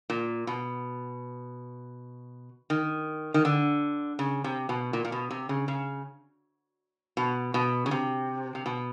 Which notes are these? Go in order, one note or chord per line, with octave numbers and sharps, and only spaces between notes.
A#2
B2
D#3
D#3
D3
C#3
C3
B2
A#2
A#2
B2
C3
C#3
C#3
B2
B2
C#3
C3
C3
B2